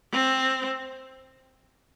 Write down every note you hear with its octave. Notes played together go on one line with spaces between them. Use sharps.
C4